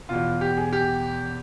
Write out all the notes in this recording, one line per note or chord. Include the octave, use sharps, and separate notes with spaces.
E2 B2 F4
G4
G#4
G4